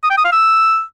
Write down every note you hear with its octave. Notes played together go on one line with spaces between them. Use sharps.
D#6
G5
D#6
F5
E6